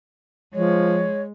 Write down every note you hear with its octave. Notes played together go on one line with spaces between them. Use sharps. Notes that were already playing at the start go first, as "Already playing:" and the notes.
F3 G#3 C#5